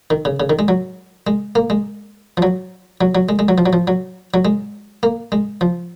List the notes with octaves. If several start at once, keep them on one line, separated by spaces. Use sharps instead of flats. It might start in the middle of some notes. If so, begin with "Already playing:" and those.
D#3
C#3
C#3
D#3
G#3
F#3
G#3
A#3
G#3
F3
F#3
F#3
F#3
G#3
G#3
F#3
F3
F#3
F3
F#3
F#3
G#3
A#3
G#3
F3